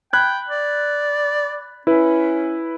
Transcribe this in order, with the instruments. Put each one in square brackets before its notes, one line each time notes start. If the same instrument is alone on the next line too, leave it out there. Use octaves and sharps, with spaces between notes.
[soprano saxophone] G5 [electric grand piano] B5 F#6 G#6
[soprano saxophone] D5
[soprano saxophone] C#4 [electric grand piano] E4 B4